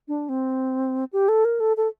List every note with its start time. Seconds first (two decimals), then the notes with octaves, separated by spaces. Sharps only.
0.08 D4
0.29 C4
1.13 G4
1.28 A4
1.45 A#4
1.60 A4
1.77 A4